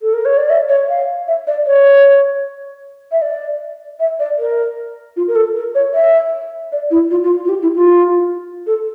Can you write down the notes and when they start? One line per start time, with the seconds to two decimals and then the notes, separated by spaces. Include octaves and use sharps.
0.01 A4
0.13 A#4
0.25 C#5
0.37 D5
0.50 E5
0.69 C#5
0.89 F5
1.28 E5
1.47 D5
1.66 C#5
3.12 E5
3.22 D5
4.00 E5
4.20 D5
4.39 A#4
5.16 F4
5.28 A#4
5.36 A4
5.55 A#4
5.75 C#5
5.94 E5
6.72 D5
6.91 E4
7.11 F4
7.24 F4
7.45 F4
7.49 G4
7.62 E4
7.75 F4
8.67 A4